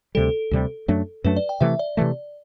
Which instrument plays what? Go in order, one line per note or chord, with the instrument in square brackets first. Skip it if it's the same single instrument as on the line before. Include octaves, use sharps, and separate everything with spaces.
[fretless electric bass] D2 C3 G3 [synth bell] A4
[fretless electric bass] D2 C3 G3
F#2 F#3 A3 D4
[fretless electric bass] F#2 F#3 A3 D4 [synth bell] B4
[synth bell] D5
G5
[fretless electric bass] C3 E3 A3 [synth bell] E5
[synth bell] D5
[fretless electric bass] C3 E3 A3